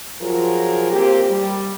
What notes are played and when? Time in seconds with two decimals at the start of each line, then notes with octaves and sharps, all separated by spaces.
0.21 F3 F#3 F4 G#4 A#4
0.91 A#3 C4 G4
1.30 G3